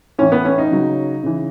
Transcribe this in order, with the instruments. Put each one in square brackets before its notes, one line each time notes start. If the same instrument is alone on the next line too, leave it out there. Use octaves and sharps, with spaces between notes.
[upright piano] A2 E3 C#4
B3
C#4
D#4
C#3 F#3
C#3 E3